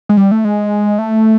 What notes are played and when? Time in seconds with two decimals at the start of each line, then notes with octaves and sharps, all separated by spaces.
0.09 G#3
0.17 G3
0.31 A3
0.45 G#3
0.99 A3